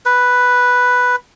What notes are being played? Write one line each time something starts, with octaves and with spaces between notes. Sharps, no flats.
B4